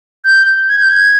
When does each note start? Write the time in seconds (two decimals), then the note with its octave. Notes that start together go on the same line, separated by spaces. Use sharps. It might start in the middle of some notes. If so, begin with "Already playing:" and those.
0.25 G6
0.69 G#6
0.79 G6
0.89 G#6